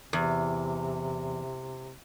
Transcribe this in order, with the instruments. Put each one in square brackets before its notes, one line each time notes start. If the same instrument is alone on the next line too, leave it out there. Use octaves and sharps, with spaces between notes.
[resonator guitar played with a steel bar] E2 [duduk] C3